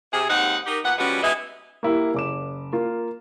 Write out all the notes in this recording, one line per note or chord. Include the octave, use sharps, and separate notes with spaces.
C3 G#4
D#2 G#2 C4 D#4 F#5
D#4 G4 A#4
A#2 B3 F#5
F3 G3 G#3 B3 C#4 F#4
B2 G#3 D#4 G#4 B4 E5
A#3 E4 G4
F#1 D6 E7
A#3 F4